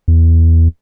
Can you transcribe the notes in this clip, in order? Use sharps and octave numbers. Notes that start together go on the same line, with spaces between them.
E2